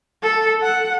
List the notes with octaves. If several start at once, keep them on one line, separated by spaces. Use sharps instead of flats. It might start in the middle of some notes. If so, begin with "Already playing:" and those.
A4
F#5